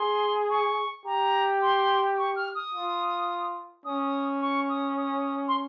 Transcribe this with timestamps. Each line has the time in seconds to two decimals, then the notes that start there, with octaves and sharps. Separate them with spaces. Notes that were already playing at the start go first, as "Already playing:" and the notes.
Already playing: G#4 C6
0.50 C#6
1.05 G4 A#5
1.62 C6
2.18 C#6
2.36 F6
2.55 D#6
2.73 F4
3.85 C#4 D#6
4.41 C#6
4.69 D#6
4.97 D#6
5.48 C6